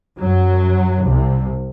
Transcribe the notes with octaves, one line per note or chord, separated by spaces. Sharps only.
F#2 F#3
C2 C3